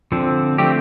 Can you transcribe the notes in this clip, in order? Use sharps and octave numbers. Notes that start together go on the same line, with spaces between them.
D3 F3 C4
D3 A3 C4 G4